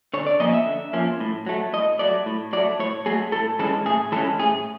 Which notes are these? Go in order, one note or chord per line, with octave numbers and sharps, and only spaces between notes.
D3 C#5
D5
F3 A#3 C#4 D#5
E5
D3
F3 A#3 C#4
A2
F#3 A3
A2 D#5
F#3 A3 D5
A2
F#3 A3 D5
A2 C#5
F#3 A3 G#4
A2 A4
E3 G#3 C#4 A4
A2 G#4
E3 G#3 C#4 A4
A2 G#4